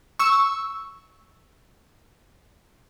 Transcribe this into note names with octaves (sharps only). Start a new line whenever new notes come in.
C#6 E6